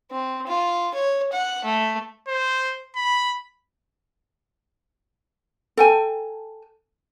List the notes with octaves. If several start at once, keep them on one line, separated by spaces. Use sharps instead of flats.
C4
F4
C#5
F#5
A3
C5
B5
A4 G5 G#5